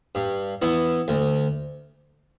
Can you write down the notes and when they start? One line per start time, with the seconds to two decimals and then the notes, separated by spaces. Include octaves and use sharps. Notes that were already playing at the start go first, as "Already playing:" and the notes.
0.15 G2
0.62 E3 B3 E4
1.08 D2